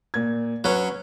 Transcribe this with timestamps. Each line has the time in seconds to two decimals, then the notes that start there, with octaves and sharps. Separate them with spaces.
0.14 A#2 G#6
0.64 F#3 C#4 B4